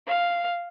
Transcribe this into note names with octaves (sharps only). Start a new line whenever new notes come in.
F5